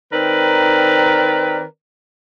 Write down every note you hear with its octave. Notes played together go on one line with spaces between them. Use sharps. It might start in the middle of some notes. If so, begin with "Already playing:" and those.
D#3 C4 A#4 B4 D5